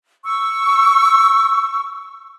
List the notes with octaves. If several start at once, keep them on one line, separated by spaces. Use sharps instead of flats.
C#6 E6